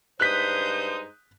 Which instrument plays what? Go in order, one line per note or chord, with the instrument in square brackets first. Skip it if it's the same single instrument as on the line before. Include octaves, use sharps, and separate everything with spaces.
[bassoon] G2 [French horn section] G#3 D#4 C5 [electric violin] D#6 G6 [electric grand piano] F#6 B6